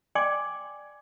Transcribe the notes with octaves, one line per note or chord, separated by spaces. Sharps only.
D5 G5 G#5 C6 D6